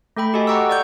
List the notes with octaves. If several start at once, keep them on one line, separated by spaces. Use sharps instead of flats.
A3 A4 G5 B5
F#4 G4 A4 D#5 G#5
F#5 G5 A#5 C#6 D6 E6
D5 C#6 G6